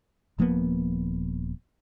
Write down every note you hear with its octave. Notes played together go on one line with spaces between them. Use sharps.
D#1 F3 A#3 B3